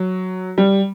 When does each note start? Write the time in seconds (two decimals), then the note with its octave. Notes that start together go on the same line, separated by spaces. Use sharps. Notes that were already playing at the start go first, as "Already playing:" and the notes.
Already playing: F#3
0.58 G3